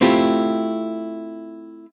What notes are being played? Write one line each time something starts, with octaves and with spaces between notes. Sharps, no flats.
A3 C4 E4 F4 G4